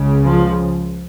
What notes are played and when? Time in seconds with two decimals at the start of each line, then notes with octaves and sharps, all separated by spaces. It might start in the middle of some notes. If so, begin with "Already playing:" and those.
Already playing: C#2 C#3
0.27 F3